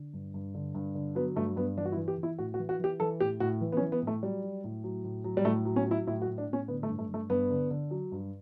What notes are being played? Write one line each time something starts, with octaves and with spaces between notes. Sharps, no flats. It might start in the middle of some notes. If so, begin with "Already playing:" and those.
Already playing: D3
G2
G2
D3
G2
D3
F#3 B3
G2 A3
G2 B3
E3 D4
F#4
E4
E3
G4
E3
E4
A2 F#4
F#4
E3
F#4
E3 G4
E3 A4
A2 G4
A2 F#4
E3
B3
C#4
E3
B3
A2
A3
F#3 G3
F#3
A2
F#3
A2
F#3
G3
A2 A3
F#3
C#4
F#3
E4
A2 E4
F#4
A2
D4
A2 C#4
D3 B3
A3
G2
A3
G2 A3
G2 B3
D3
D3
F#3
G2